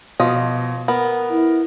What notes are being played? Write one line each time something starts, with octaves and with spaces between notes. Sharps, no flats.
B2 F3 D#5
B3 A#4
E4